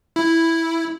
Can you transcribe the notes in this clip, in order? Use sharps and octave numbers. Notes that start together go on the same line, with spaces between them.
E4